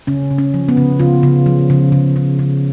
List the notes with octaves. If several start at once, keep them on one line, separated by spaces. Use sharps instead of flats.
C#3 C#4
C#3
C#4
F3
B3
C#3
C#3 F4
C#3
F3
C#3
C#3
C#3
C#3